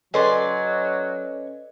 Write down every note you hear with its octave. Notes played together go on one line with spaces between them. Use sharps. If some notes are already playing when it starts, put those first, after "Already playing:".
F#3 C#4 G#4 A4 B4 D5 D#5 C6